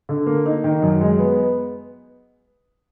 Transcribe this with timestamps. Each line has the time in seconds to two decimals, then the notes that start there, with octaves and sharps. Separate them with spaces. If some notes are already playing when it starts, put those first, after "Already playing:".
0.09 D3
0.26 A#3
0.46 D#4
0.64 D#3
0.82 F#2
1.01 G#3
1.19 B3